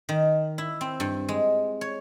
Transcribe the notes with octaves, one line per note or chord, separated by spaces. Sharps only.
D#3
E4
C4
G2
G#3
C#5